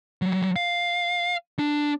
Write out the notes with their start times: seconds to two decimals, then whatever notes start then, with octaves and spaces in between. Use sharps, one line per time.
0.22 F#3 G3
0.56 F5
1.59 D4